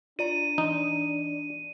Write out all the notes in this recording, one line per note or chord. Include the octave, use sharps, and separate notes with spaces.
D4 F4 D5 A#5 D#7
E3 D#4